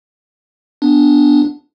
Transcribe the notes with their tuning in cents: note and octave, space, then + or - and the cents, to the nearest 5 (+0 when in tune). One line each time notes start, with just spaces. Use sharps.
B3 +0 D4 +0